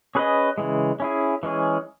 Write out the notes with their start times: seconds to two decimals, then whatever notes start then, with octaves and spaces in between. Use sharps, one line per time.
0.15 C#4 G#4 B4 D#5
0.58 C#3 E3 G#3
1.00 C#4 E4 G#4
1.43 E3 G#3 C#4 G#4